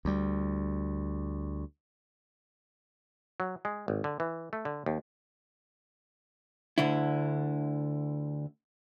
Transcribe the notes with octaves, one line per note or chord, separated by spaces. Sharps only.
D2 G3
F#3
G#3
G#1
D3
E3
A3
D3
D#2
D2 D3 E4